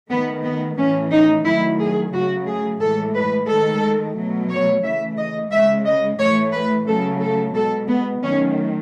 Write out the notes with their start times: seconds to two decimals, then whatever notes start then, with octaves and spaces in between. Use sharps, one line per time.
0.10 D#3 A3 B3
0.44 B3
0.77 A2 E3 A3 C#4
1.11 D#4
1.45 D#3 F#3 A3 E4
1.79 G#4
2.13 C#3 F#3 A3 F#4
2.47 G#4
2.81 A2 E3 G#3 A4
3.15 B4
3.48 D#3 G#3 A4
4.16 B2 F#3 A3
4.50 C#5
4.83 C#3 E3 A3 E5
5.17 D#5
5.51 C#3 G#3 E5
5.85 D#5
6.19 A2 E3 A3 C#5
6.52 B4
6.87 C#3 F#3 A3 A4
7.21 A4
7.54 B2 G#3 A4
7.88 B3
8.22 D#3 F#3 A3 C#4